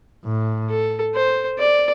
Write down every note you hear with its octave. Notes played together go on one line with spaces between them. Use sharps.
A2
A4
C5
D5